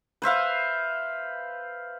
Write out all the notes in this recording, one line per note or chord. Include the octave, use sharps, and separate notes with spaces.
B4 C5 E5 F5